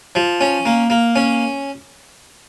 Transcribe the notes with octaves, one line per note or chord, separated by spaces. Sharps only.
F3
C#4
A#3
A#3
C#4